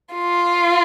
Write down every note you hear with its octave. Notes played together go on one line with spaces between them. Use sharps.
F4